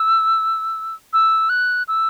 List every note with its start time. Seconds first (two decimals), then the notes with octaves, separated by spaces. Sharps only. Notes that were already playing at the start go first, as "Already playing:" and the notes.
Already playing: E6
1.13 E6
1.49 F#6
1.88 E6